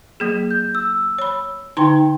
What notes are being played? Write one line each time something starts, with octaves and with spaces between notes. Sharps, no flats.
F#3 A#3 G#4
G6
E6
C#5 B5
D3 D#4 G5 A#5 C6